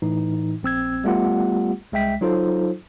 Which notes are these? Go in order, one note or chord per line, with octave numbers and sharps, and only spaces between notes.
A2 E3 D#4
A#1 C4 E6 G#6
G3 A3 B3 F4 G4 F#5
C2 G#3 E5 G5 B6
F#3 D#4 F4 A4 C5